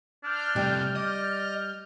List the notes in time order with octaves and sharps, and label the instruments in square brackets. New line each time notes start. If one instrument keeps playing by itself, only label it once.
[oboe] D4 [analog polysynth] F6 G6
[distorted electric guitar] C3 A3 [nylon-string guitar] G3
[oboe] D5 [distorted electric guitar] D#5